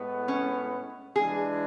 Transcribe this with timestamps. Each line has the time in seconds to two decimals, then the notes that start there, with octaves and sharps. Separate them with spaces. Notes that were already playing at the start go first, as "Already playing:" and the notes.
Already playing: A2 G#3 B3
0.28 C#4
1.14 E3 G#3 D4 G#4